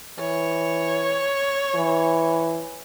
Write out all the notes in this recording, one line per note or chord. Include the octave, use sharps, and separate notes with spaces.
E3 C#5
E3